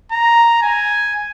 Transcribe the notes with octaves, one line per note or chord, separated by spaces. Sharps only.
A#5
G#5